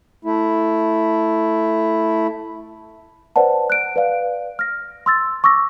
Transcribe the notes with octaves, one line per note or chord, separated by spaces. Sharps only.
A3 E4
B4 C5 D5 F#5 A5
F#6 D7
B4 D5 F5
F6 A#6
C6 E6 A6
C#6 D6 E6 A#6